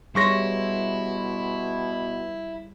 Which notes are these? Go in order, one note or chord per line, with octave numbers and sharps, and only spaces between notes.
B2 G3 E4 G#4 C#5 C6 C#6 A#6